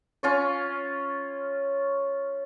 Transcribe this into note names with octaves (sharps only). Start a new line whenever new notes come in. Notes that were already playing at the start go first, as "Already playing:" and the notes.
C#4 F4 C#5